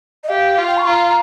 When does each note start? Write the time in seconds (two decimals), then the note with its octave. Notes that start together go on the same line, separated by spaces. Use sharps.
0.24 D#5
0.29 G4 F5
0.58 F4
0.67 G5
0.77 C#6
0.87 F4 A#5